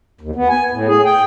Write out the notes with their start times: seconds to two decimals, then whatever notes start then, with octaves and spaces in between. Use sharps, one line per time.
0.21 D#2
0.35 B3
0.49 G#5
0.73 A2
0.88 G#4
1.05 G5